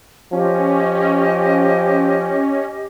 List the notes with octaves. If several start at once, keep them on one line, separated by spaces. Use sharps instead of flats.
F3 C#4 G4 D#5